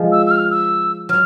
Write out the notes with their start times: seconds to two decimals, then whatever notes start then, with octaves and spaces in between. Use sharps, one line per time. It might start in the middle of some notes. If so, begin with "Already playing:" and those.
Already playing: F3 G#3
0.12 E6
0.26 E6
0.31 F6
0.50 E6
1.09 F#3 F6